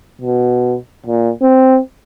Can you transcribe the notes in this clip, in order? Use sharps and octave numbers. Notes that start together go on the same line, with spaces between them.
B2
A#2
C4